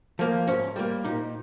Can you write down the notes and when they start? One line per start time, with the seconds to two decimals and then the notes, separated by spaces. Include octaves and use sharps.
0.19 F3 A#3
0.47 G#2 C#4
0.76 G3 A#3
1.04 A#2 D#4